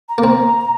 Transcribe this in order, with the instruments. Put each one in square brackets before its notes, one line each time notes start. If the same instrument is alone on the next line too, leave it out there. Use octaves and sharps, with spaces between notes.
[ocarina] A#5
[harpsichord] A#3
C4